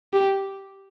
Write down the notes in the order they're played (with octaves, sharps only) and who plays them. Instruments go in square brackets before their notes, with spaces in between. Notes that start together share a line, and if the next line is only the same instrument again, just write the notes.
[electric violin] G4